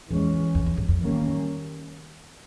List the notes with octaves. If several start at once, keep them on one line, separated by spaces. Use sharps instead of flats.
E2 E3 G#3 C#4
F2
E2
G2
F2
D#3 G3 A#3 C#4